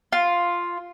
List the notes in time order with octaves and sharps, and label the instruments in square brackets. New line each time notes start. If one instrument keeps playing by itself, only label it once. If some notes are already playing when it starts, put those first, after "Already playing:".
[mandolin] F4